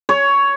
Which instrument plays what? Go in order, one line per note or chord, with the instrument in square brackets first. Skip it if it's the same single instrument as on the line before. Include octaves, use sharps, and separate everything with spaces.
[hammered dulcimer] C#5